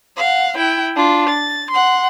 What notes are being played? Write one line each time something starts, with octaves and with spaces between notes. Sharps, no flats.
F5 F#5
E4 G5
D4 F4
A6
F#5 C6